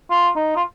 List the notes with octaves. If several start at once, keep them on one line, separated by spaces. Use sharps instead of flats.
F4
D#4
F4